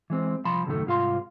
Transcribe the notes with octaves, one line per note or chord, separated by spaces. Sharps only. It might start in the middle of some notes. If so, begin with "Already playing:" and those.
E3 G#3 C4
C2 F3 A5 B5 C6
C#2 F#2 A2 D#3 A3
C2 G#2 F4 F5 C6